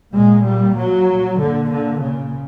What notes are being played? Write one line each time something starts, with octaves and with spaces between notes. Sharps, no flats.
A#2 G#3
G3
F#3
A#2 D3
D3
C#3